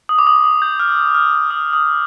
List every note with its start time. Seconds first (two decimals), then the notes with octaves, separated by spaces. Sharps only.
0.09 D#6
0.19 D6
0.27 D#6
0.44 D#6
0.62 G6
0.80 F6
1.15 F6
1.51 D#6
1.73 D#6